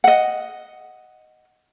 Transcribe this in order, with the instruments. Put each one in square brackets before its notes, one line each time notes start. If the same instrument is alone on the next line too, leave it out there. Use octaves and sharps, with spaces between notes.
[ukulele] D#5 F#5